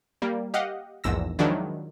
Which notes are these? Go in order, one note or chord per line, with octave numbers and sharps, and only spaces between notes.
G3 A#3
G4 D#5 F5 F#5
A#1 E2 G#2 E6 A#6
D#3 F3 F#3 G#3 D4 E4